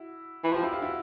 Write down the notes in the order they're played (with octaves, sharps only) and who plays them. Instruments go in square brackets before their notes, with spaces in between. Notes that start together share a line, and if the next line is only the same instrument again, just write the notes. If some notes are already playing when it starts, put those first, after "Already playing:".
Already playing: [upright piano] E4 F#4
[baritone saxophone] E3
[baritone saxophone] F3 [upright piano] F4 G4
[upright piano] E4 F#4
F4 G4
E4 F#4